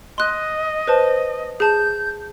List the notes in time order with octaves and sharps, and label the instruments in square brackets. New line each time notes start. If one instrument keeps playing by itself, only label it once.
[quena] D#5 [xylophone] C6 F#6
[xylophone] B4 C5 A5
[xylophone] G#4 A5 [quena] G6